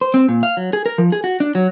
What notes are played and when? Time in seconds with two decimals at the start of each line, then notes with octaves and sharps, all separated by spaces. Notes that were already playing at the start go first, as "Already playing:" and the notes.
0.01 C5
0.14 C4
0.29 A#2
0.43 F5
0.57 F#3
0.73 G#4
0.86 A#4
0.98 F3
1.12 G#4
1.24 F#4
1.40 D4
1.55 F#3